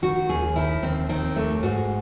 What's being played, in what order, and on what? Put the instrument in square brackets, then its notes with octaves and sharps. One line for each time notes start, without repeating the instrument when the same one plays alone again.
[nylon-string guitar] D#3 F#4
D#2 G#4
D#3 E4
D#2 C4
D#3 C4
D#2 A3
G#2 F#4